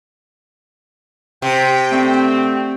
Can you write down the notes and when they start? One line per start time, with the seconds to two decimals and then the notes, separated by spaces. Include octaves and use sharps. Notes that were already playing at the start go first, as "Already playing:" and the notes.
1.42 C3 G5
1.92 D3 A3 C4